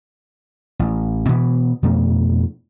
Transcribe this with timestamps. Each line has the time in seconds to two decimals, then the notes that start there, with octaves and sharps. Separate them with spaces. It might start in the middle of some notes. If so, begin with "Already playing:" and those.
0.79 A1
1.29 B2 E3 B3
1.83 F2 B2 A3 D4